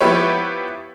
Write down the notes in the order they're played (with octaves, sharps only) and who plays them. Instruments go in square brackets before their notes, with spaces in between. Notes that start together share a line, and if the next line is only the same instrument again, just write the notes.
[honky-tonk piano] F3 B3 E4 G4 B4 C#5